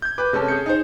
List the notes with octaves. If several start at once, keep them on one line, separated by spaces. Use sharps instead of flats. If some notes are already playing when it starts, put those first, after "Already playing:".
G6 G#6
B4 D6
C3 G#3 C#4 A4
G#4 G6 C#7
D#4 C5